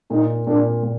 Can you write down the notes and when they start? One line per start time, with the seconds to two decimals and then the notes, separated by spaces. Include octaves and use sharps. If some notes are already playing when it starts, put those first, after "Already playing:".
0.10 A#2 D#4
0.46 A#2 D4
0.83 A#2